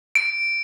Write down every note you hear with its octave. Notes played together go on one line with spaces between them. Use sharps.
D7